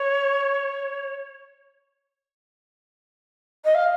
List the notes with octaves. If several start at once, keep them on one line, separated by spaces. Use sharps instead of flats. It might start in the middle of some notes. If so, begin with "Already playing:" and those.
Already playing: C#5
D#5
F5